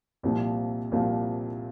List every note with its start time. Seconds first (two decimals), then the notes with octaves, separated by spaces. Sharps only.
0.23 C2 A#2 F3 A#3
0.92 C2 A#2 F3 A#3